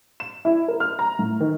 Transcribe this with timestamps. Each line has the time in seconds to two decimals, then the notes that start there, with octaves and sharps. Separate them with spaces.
0.20 E7
0.45 E4
0.68 A#4
0.80 F6
0.99 A#5
1.19 A2
1.40 D#3